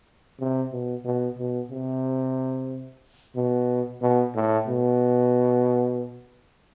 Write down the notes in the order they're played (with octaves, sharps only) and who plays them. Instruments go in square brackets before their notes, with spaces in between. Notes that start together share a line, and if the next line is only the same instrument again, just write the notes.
[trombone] C3
B2
B2
B2
C3
B2
B2
A2
B2